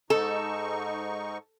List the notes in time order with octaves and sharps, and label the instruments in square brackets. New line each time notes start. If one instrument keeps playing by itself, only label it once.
[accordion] G#2 D#4 C#6 [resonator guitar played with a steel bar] A4